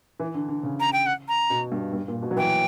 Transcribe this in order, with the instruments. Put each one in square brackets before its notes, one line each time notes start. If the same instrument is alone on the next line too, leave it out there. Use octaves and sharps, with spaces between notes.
[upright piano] E3
D3
D3
C#3
[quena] A#5
G5
F#5
A#5
[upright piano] B2
G2
G2
A#2
B2
F#3
[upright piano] E3 [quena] G5